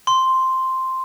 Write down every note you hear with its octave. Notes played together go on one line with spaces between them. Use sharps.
C6